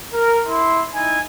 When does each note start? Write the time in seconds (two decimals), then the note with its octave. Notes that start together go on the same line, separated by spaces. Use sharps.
0.13 A#4
0.47 E4 C6
0.93 D#4 E4 G#5